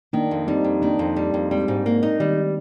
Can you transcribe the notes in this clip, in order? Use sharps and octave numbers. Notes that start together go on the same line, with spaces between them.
D#3 A#3 D4
F2
G3 C4 D#4
F2
D#3 A#3 D4
F2
G3
F2
G3 G#3 C4
G#2
A#3
D#4
D#3 G3